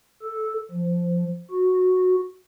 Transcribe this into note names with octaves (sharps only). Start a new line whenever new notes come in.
A4
F3
F#4